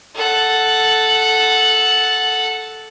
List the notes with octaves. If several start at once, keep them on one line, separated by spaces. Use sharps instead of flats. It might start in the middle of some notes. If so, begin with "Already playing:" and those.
A4 F#5